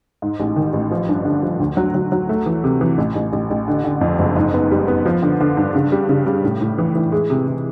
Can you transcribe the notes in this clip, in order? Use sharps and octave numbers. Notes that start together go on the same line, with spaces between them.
G#2
A1
D#3
A1
F3
G2
D3
F3
D2
F#3
F#3
F#3
A3
E3
C3
E3
A1
A1
A1
A1
D3
D3
F2
F#1
G#2
B3
G3
B3
F3
D3
D3
G2
C#3
G3
C#3
G3
A2
A2
E3
E3
G#3
C3
C3